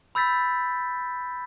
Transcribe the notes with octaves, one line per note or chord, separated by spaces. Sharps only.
B5 E6 G6 A6 B6